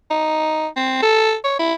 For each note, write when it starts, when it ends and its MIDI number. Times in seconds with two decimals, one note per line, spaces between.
0.10 0.68 63
0.76 0.99 60
1.02 1.35 69
1.44 1.58 73
1.59 1.74 64